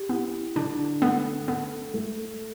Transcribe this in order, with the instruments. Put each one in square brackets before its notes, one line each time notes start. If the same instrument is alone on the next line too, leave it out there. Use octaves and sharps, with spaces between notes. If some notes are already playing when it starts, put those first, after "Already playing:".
Already playing: [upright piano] G4
[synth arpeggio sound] B3 [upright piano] E4
[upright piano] D3 [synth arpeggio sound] D4
[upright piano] A3 [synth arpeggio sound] B3
[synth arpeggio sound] B3 [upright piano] A4
[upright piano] A3